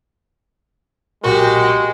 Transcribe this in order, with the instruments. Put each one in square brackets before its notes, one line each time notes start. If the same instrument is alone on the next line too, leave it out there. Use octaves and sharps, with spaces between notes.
[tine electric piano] B1 A#2 A#4 [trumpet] G#3 [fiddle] F#4 G4